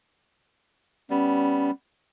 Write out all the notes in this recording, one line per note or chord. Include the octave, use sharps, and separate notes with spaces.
G3 B3 C#4